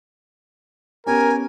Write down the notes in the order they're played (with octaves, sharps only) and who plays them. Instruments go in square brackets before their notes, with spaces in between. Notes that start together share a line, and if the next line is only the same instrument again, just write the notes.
[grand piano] B3 C#4 G4 [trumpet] A#4 [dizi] G#5